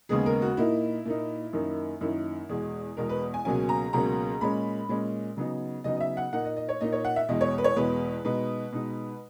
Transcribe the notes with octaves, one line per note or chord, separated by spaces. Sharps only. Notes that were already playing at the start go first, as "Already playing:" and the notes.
D#2 C#3 G#3 B3 G#4
A#4
F#4
A#2 A#3 D#4 E4
A#2 A#3 D#4
F#2 D#3 A#3 D#4
F#2 D#3 A#3 D#4 E4
E2 B2 G#3 G#4
E2 B2 G#3 A#4
B4
G#5
C#2 B2 F#3 A#3 C#4 G#5
A#5
C#2 B2 F#3 A#3 C#4 A#5
A#2 G#3 C#4 B5
A#2 G#3 C#4
C#3 F#3 B3 D#4
C#3 F#3 B3 D#4 D#5
D#5
E5
F#5
A#2 A#3 D#4 F#5
D#5
D#5
C#5
A#2 A#3 D#4 D#5
C#5
F#5
E5
E2 B2 G#3 D#5
C#5
B4
C#5
E2 B2 G#3 B4
B2 G#3 D#4 B4
B2 G#3 D#4